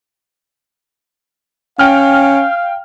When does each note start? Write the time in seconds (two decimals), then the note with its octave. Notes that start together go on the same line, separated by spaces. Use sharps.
1.79 C#4 F5 G5 F6